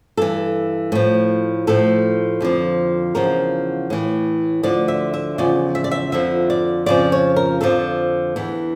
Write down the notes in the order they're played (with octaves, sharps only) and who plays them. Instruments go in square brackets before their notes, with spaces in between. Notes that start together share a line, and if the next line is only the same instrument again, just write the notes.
[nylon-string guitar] G2 E3 A4
A2 F3
A2 F3 A4
F2 D3 F3
E2 C#3 F3 A#4
A2 E3
D2 D3 F3 D5
E5
E5
E2 C#3 F3 D5
E5
D5
E5
F2 D3 F3 E5
D5
F2 C#3 F3 D5
C#5
A#4
F2 D3 F3 A4
E2 E3